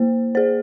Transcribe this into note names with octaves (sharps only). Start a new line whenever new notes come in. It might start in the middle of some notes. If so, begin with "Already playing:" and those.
Already playing: A#3 C5
G#4 C5